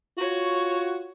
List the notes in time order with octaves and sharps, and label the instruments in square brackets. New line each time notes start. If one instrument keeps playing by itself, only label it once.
[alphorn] F4 [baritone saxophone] F#4 [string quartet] C#5